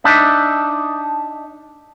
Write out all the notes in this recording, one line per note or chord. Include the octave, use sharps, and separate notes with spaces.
D4 D#4 E5